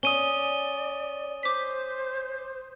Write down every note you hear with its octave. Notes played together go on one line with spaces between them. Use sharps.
C#4 D5 D#6 D#7 G7
C5 D6 B6